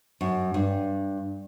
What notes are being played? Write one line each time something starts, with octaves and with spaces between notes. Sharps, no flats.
F#2
G2